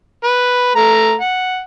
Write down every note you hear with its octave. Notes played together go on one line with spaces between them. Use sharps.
B4
A3 A#5
F#5